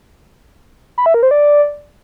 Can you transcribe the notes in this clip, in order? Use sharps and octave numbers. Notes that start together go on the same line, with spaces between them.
B5
E5
A#4
C5
D5